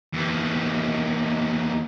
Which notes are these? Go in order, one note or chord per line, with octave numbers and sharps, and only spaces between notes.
D#2 E3